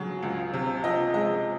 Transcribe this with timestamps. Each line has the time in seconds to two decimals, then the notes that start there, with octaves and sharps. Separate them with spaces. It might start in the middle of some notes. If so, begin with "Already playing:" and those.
Already playing: C#3 F#3
0.23 C#2
0.53 C3
0.84 F3 D#5
1.14 G#3 D#5